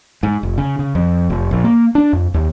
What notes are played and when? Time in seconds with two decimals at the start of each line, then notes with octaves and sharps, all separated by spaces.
0.23 G#2
0.43 F1
0.58 C#3
0.79 C#3
0.95 F2
1.30 F1
1.51 A#1
1.64 A#3
1.95 D4
2.13 F2
2.34 D#2